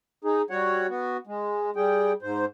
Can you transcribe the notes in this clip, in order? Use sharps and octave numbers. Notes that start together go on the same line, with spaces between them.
D#4 G#4
G3 F#4 C#5 F#5
B3 F#4
G#3
G3 G#4 G5
G#2 C5